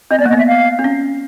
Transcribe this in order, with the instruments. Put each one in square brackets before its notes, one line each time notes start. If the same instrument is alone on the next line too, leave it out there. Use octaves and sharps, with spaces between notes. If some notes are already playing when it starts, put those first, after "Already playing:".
[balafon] C4 [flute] D#5
[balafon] B3 [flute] D5
[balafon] A#3
[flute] D#5
[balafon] B3
[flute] E5
F5
[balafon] C4
C#4